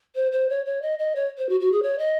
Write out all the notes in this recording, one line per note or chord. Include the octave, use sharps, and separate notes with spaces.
C5
C5
C#5
C#5
D#5
D#5
C#5
C5
F#4
F#4
G#4
C#5
D#5